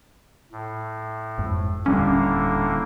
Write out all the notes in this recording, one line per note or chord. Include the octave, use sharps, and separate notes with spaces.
A2
G1 F2 G#2
D#1 A2 D3 G3 A#3 C#4 D4